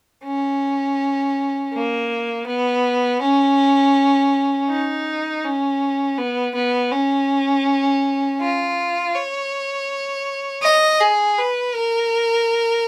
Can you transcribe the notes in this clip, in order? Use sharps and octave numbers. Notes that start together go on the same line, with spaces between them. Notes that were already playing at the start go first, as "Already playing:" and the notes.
C#4
A#3
B3
C#4
D#4
C#4
B3
B3
C#4
F4
C#5
D#5
G#4
B4
A#4